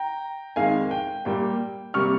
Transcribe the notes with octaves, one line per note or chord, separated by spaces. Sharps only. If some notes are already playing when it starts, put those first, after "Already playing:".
Already playing: G5 A#5
F2 D#3 G#3 F5 G#5
G5
A#2 G3 A#3 G5
C3 G3 A#3 C#6 F6